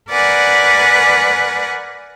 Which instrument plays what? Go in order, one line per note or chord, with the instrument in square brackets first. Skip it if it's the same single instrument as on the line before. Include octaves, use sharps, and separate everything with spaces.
[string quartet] A#4 B4 D5 F#5 G#5